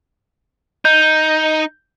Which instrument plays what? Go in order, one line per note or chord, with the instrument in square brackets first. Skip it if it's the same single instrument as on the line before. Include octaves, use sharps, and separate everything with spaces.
[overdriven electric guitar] D#4 [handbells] G6